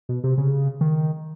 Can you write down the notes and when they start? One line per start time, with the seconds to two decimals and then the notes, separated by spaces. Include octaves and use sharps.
0.09 B2
0.24 C3
0.38 C#3
0.81 D#3